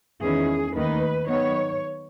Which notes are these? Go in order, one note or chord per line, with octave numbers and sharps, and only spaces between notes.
E2 D#3 G#3 C#4 E4 G#4
D#2 D#3 A3 D#4 B4
D#3 F#3 B3 D#4 C#5